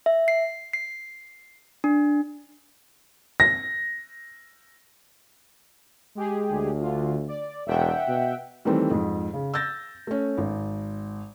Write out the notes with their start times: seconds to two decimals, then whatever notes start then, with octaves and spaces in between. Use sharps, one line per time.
0.06 E5
0.28 C7
0.73 C7
1.84 D4
3.40 A#6
6.15 G#3 G4 G#4
6.51 D2
6.81 D3 F4
7.28 D5
7.67 E1 E5 F#5 G5
8.08 B2
8.65 D#3 E3 G3 A3 C4
8.91 F2 G#2
9.34 C#3
9.54 E6 G6 A6 A#6
10.07 A3 C#4
10.38 G#1